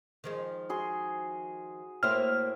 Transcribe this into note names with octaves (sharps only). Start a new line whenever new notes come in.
D#3 F3 G#3
F#4 G#4 C6
A2 A#3 C5 E5 F6